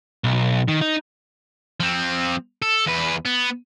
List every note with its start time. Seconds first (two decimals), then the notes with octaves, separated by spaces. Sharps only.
0.24 B1
0.68 D#3
0.81 D#4
1.80 F3 C4
2.62 A4
2.86 E2 B4
3.26 B3